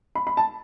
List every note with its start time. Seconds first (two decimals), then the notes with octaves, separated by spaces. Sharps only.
0.15 B5
0.27 B5
0.37 A5